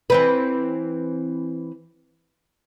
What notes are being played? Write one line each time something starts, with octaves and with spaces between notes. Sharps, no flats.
E3 C4 B4